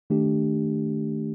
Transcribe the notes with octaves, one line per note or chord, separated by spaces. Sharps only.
D#3 A3 D4 G4